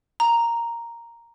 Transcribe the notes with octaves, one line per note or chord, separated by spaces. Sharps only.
A#5